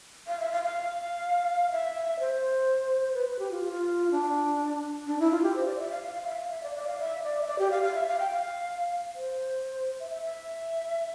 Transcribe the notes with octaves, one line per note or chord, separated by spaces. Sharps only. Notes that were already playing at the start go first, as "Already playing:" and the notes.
F5
E5
F5
F5
E5
C5
B4
B4
G4
F4
F4
D4
D4
E4
F4
G4
C5
D5
E5
F5
F5
F5
E5
F5
E5
D5
D5
F5
E5
D5
E5
D5
G4
F5
F5
E5
F5
G5
F5
C5
E5
E5
E5